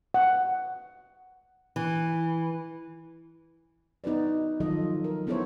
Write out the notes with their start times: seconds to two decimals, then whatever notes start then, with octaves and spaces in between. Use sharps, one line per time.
0.14 F#5
1.76 E3
4.04 B3 D#4 F#4 B4 D5
4.60 D#3 F3 F#3 F4 A4 D#5
5.04 A#4
5.27 B3 D#4 E4 A4 C5 C#5